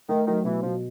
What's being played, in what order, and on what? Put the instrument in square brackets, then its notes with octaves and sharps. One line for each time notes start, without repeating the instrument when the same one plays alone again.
[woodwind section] D#3 [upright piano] A3
[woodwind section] D#3 [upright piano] F#3
[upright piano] B2 [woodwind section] E3
[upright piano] B2 [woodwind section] F3